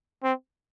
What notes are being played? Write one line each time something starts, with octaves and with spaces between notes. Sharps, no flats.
C4